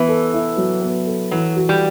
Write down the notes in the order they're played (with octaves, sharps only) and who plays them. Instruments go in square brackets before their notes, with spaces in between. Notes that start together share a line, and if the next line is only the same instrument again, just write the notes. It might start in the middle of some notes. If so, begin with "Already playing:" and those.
Already playing: [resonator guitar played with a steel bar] E3 [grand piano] B3
[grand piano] A4
E4
F#3
B3
A4
[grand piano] E3 [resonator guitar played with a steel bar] F#3
[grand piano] F#4
[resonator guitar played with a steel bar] G3